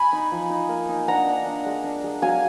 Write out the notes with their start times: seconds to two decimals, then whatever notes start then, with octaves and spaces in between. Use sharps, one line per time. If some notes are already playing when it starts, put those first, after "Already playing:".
Already playing: G#5 B5
0.13 D#4
0.32 F3
0.50 D#4
0.69 A#3
0.89 D#4
1.08 D4 F#5 A#5
1.26 D4
1.46 D4
1.66 G#3
1.84 D4
2.04 G#3
2.22 F#3 F5 G#5